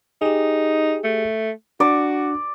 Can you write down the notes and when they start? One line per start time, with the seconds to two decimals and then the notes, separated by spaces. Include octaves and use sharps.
0.22 D#4 G4 G#4
1.04 A3
1.80 D4 F#4 D5